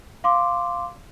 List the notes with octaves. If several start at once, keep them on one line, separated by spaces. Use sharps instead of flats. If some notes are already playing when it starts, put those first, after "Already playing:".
F5 C6 D6